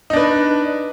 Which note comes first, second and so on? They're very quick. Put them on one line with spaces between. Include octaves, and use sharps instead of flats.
D#4 D4 B4